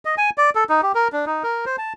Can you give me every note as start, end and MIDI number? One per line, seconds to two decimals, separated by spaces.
0.05 0.15 75
0.18 0.30 80
0.38 0.50 74
0.55 0.64 69
0.69 0.81 63
0.83 0.92 67
0.95 1.08 70
1.13 1.25 62
1.26 1.43 63
1.44 1.65 70
1.66 1.76 72
1.78 1.93 81